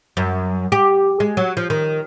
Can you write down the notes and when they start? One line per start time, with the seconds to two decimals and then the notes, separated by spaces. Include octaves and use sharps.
0.17 F#2
0.72 G4
1.20 G#3
1.37 F#3
1.57 F3
1.70 D#3